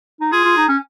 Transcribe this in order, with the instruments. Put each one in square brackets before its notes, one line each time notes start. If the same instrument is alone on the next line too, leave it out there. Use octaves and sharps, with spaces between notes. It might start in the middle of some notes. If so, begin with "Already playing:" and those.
[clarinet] D#4
[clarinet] F4 [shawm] G#4
[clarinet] F4
D#4
C#4